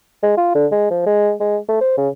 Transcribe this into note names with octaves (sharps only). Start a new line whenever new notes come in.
G#3
F4
D3
G#3
F3
G#3
G#3
A3
C5
C#3